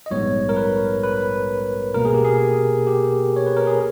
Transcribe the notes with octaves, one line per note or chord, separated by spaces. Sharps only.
D#5
A#1 G#2 G3 B3 C#5
A#4
B4
B4
C#2 B2 A#3 A#4
G#4
G4
G#4
G4
C#5
B4
A#4
G#4